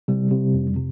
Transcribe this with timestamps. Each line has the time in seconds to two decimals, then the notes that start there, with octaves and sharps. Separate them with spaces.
0.08 C3 G3
0.31 C3
0.54 F2
0.76 C3